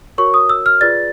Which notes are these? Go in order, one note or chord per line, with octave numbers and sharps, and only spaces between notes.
F#4 A#4 C#5 C#6
D#6
E6
F6
F4 G#4 B4 D5 A6